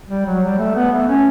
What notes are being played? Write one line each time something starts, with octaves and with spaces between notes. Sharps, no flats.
G3
F#3
G3
A3
B3
A3
C#4